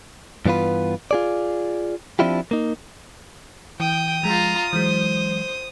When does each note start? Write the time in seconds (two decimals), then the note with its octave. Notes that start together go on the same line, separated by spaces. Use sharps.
0.46 G2 E3 B3 F4 B4
1.11 F4 G#4 D5
2.19 F3 C4 D4 E4 F4 G4
2.51 A#3 D#4
3.80 E3 G5 D#6
4.23 F3 G#3 F4 A#5
4.73 E3 F#3 G#3 C5